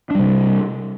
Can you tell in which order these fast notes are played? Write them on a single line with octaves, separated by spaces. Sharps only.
D4 G3 C3